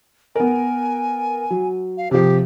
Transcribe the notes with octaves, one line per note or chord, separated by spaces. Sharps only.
B3 A#4 G#5
F#3
F5
C3 F3 G4